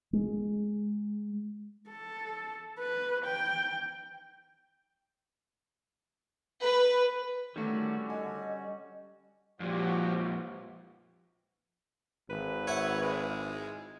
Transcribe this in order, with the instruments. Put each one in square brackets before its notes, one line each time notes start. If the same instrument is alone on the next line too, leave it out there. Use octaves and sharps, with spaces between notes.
[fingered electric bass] G#3
[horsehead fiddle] A4
B4
G5
[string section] B4
[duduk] D3 [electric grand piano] D#3 A3 [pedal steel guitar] G3 C#4 F#4
[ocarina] D#5 [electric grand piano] G#5
[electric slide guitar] F2 A#2 [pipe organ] F3 F#4 G4
[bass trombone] G#1 [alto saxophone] B4
[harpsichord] E4 F#5 [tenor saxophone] C#5
[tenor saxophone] G#3